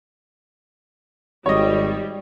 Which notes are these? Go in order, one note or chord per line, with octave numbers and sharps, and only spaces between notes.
G#1 G3 C#5 D#5